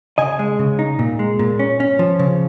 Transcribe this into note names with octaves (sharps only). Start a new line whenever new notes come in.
C#3 D#5 G#5
G#3
C#3
D#4
A#2
G#3
A#2
C#4
C#4
F3
C#3